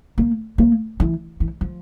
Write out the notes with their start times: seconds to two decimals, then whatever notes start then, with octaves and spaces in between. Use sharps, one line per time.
0.18 A#3
0.58 A#3
1.00 E3
1.40 E3
1.61 F3